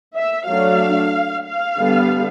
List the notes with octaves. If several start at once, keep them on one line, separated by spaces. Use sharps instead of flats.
E5
F#3 A3 D4 F5
F5
D3 G3 B3